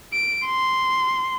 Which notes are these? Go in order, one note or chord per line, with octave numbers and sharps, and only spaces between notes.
D7
C6